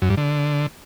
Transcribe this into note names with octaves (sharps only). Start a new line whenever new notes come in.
F#2
G2
D3